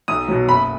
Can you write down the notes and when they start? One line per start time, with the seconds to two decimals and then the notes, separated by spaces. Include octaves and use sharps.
0.08 B1 D#6
0.28 B2 F#3
0.48 F#1 B5